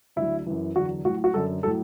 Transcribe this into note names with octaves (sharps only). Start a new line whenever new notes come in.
D2 D3 F#3 E4
F#2 E3
E2 D3 F#3 F#4
A2 F#3 F#4
F#4
F#2 D3 F#3 A4
A2 F#3 A4